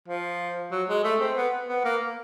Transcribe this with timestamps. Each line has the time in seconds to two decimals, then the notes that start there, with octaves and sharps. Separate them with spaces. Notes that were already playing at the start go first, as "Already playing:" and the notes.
0.08 F3
0.72 F#3
0.89 G#3
1.04 A3
1.21 C4
1.37 B3
1.69 B3
1.85 A#3